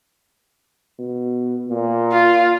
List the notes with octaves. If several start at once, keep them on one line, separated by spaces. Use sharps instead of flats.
B2
A#2
F4